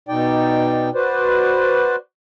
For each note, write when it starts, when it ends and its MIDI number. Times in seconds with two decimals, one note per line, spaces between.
0.09 0.90 47
0.09 0.90 63
0.09 0.90 74
0.09 0.90 79
0.95 1.96 66
0.95 1.96 71
0.95 1.96 72
0.95 1.96 74